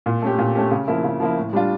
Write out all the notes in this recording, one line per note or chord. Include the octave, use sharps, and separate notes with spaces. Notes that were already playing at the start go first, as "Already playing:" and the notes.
A#2
A3 C#4 G4
A#2
A3 C#4 G4
C#3
F3 A#3 E4
C#3
F3 A#3 E4
A2
G3 D4 F4